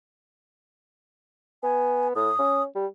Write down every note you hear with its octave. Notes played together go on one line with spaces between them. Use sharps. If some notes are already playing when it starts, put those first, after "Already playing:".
B3 G#5
A2 D#6
C#4
G3